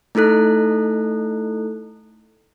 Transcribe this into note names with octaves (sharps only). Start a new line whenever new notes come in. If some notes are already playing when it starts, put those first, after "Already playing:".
A3 D#4 E4 A4 F#6